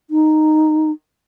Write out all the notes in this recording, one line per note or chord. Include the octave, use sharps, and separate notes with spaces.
D#4